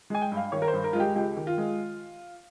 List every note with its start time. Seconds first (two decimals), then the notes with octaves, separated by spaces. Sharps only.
0.10 G#3 G#5
0.22 G5
0.32 G2
0.37 F5
0.52 D#3 C#5
0.62 A#4
0.68 C5
0.73 G2
0.84 A#4
0.93 G#3 F4
1.00 G4
1.16 C#2 G4
1.37 D#3
1.47 F4
1.58 G#3